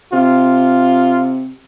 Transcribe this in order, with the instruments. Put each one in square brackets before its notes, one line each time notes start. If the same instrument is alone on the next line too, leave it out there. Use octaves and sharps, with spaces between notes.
[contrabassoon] C3 [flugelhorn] F4